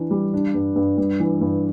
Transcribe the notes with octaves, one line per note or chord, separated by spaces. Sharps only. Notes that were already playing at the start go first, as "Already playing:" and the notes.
Already playing: E3 D4
G3
D4
G2
G2
G2
E3
G2